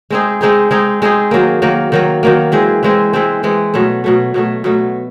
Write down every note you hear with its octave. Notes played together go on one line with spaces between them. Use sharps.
G#3 C4 D#4 G#4
G#3 C4 D#4 G#4
G#3 C4 D#4 G#4
G#3 C4 D#4 G#4
D#3 F#3 A#3
D#3 F#3 A#3
D#3 F#3 A#3
D#3 F#3 A#3
E3 G#3 C4
E3 G#3 C4
E3 G#3 C4
E3 G#3 C4
B2 F#3 A3
B2 F#3 A3
B2 F#3 A3
B2 F#3 A3